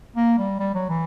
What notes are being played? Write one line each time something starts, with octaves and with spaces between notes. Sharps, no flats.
A#3
G3
G3
F#3
E3